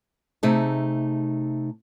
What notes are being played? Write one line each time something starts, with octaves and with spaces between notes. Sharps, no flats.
C3 A3 D#4 G#4 A5